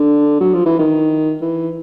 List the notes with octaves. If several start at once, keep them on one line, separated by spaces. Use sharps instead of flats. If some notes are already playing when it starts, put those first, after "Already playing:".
Already playing: D3
F#3
F3
E3
D#3
E3